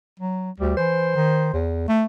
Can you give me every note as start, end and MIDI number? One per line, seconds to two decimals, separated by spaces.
0.20 0.51 54
0.60 0.74 38
0.60 0.73 55
0.77 1.15 52
0.77 1.65 72
1.16 1.53 51
1.53 1.84 40
1.88 2.05 57